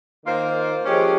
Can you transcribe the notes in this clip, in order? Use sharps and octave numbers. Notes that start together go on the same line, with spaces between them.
D#3 A#3 F4 C5
F3 G#3 C#4 G4